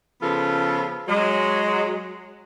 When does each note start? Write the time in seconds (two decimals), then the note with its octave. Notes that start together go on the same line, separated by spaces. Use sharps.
0.21 C#3 F3 B3 F4 A4
1.08 F#3 G#3